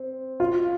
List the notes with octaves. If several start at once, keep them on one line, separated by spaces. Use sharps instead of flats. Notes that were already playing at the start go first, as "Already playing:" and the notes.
Already playing: C4
F4